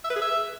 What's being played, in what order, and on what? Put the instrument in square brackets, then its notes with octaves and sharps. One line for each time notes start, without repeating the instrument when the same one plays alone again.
[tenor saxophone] E5
B4
G#4
E5